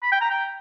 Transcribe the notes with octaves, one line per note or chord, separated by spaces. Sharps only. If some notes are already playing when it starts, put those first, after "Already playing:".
B5
G5
A#5
G5